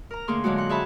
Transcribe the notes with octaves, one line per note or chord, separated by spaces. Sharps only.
A#4 A#5
D3 A3 A#3 G#4 C6
A#2 D3 F#3 G#3 F#4
F#5 C6
G#4 C#5 E5 A5 B5